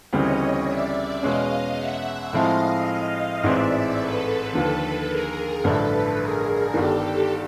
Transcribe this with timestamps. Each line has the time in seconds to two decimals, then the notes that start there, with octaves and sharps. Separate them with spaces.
0.12 D2 C#3 E3 G3 C4 C#5 D#5
0.68 D5 E5
1.23 E2 B2 G#3 C#4 D#5 F5
1.78 E5 F#5
2.33 A2 F3 G#3 C4 E4 D#5 F5
3.43 A1 G#2 E3 G#3 C4 D5 E5
3.99 A4 B4
4.53 D#2 D3 F3 A4 B4
5.09 G#4 A#4
5.63 A1 G2 D3 F3 A3 A4 B4
6.19 G#4 A#4
6.73 G1 G2 D#3 G4 A4